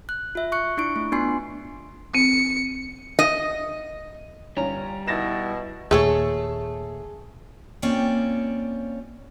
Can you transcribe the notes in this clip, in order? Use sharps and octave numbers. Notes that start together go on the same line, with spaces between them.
F#6
F4 E5
C#6 F#6 C#7
D4 E4 C#6 D7
A3
B3 D4 F4 G#5 C6 C7
C4 C#7
D#5
G1 G3 C#4 A#5
B2 E4 A6 A#6 E7
D#2 A#2 A3 G#4 A4 C#5
A#3 C4 C#4 F4 D5 G5